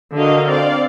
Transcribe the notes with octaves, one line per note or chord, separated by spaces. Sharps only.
D3 F#4 A#4 D#5 F5
C4 D5 F5